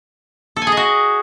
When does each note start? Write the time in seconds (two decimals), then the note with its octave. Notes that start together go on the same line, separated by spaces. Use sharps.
0.56 A4
0.62 G#5
0.67 G#4
0.72 D#5
0.77 F#4